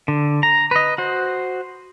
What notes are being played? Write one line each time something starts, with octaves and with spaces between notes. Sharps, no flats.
D3
A#5
B4 D#5
F#4 C5